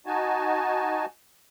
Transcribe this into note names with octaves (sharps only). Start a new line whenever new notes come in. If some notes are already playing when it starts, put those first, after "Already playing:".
D#4 F#4 G#5 A5